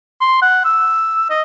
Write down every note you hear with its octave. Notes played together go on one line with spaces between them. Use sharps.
C6
F#5
E6
D#5